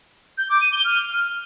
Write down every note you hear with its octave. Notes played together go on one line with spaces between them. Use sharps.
G6
D6
D#7
G7
F6